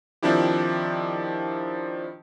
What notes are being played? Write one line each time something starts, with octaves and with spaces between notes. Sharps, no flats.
D#3 F3 C4 D4 E4 G4